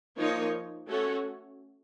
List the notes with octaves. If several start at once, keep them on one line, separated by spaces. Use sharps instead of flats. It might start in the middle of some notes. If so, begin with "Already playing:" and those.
F3 A#3 D#4 A#4 C#5
A3 C#4 F#4 A4 C#5